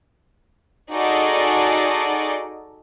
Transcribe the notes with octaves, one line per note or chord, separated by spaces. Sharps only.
D#4 F#4 G#4 A4 D5 D#5